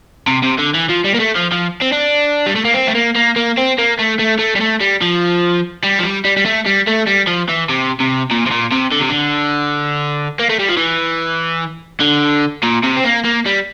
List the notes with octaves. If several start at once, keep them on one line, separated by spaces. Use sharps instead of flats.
C3
C3
D3
E3
F3
G3
A#3
A3
F3
F3
C4
D4
G3
A3
A#3
C4
A3
A#3
A#3
A#3
C4
A#3
A3
A3
A3
G3
A3
G3
F3
G3
F3
G3
G3
G3
A3
G3
A3
G3
F3
E3
C3
C3
A#2
C3
A#2
C3
D3
C3
D3
A#3
A3
G3
F3
E3
D3
A#2
C3
C4
A#3
A#3
G3